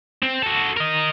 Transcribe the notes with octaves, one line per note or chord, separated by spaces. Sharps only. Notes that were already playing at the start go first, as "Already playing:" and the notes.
C4
F#4 A4
A#4 D#5